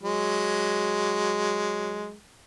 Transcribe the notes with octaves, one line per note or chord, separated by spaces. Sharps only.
F#3 G#3